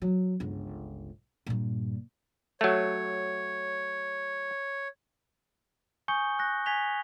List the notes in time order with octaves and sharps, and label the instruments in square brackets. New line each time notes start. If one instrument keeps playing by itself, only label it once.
[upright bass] F#3
G1 C#2
G2 A#2
[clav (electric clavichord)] F#3 A3 [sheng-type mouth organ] C#5
[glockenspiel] G#5 C#6 D#6 G6 C#7 G7
F#6 A#6
G#5 G#6 B6 F7 G7